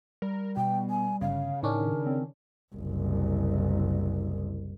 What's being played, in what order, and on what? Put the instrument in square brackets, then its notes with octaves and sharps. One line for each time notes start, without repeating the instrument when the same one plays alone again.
[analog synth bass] G3 [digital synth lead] A#4
[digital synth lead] B2 [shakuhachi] G5
[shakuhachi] G#5
[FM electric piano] G1 [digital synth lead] C#3 [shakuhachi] F5
[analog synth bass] A2 [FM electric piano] D#3 C#4 D4 [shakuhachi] A#4
[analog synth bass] C4
[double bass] F#1 C2